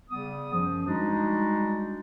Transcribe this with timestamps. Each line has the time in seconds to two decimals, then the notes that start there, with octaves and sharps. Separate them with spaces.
0.10 C#3 G3 B3 D#6
0.52 F#2 F3
0.87 G3 G#3 D4 D#4 F#4